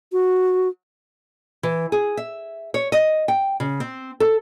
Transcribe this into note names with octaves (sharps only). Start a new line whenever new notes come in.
F#4
E3
G#4
E5
C#5
D#5
G5
C#3
C4
A4